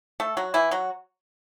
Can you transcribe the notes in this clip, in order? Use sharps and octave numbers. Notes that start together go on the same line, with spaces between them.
A3 A4
F#3 F#4
E3 E4
F#3 F#4